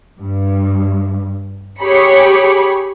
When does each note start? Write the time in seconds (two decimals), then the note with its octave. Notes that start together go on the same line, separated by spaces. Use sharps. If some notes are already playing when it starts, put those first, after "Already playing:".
0.19 G2
1.80 G4 G#4 C#5 B5 C#7